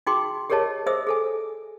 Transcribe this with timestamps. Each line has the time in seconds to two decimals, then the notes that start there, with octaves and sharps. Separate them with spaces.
0.07 D#4 F#4 G#4 G5 C6 D6
0.50 G4 G#4 A#4 C#5 D#5 A5
0.86 G#4 C5 D#5 E5 D#6 E6
1.07 G#4 A4 G#5